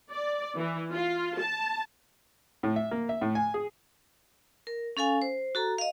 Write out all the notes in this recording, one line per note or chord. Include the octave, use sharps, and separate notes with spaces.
D5
E3
F4
A5
A2
E5
A#3
E5
A2
G#5
G#4
A#4
C#4 A4 F5 G#5
C5
F#4 A4 A#5
D#5 F5